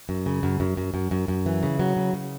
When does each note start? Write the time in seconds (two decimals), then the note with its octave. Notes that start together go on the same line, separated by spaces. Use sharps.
0.09 F#2
0.26 C#3
0.43 F#2
0.60 F#2
0.77 F#2
0.94 F#2
1.11 F#2
1.28 F#2
1.46 E3
1.63 C#3
1.79 F#3
1.97 C#3
2.13 C#3